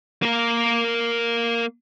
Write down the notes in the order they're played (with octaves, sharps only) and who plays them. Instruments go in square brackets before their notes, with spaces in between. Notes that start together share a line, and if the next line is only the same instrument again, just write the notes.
[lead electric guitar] A#3 A#4